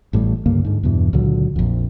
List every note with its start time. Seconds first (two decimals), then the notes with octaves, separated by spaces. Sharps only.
0.13 A1 A2 G3
0.46 C#2 G2 D3 A#3
0.65 G#2 D3
0.83 E2 G2 B2 E3
1.13 C#2 A#2 D3 F#3
1.56 A#1 F2